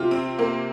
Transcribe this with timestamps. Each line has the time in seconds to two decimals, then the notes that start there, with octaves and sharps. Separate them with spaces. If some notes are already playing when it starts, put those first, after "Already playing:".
Already playing: C3 F4
0.11 C4
0.39 A#3